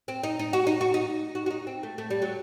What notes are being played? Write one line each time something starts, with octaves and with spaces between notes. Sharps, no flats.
C4
D#4
D#4
F#4
D#4
F#4
D#4
F#4
F#4
D#4
C4
A3
A3
G3
F#3